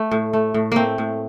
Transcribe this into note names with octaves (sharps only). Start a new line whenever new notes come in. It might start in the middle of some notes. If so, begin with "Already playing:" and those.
Already playing: A3
A2
A3
A2
A3 A#3 C4
A2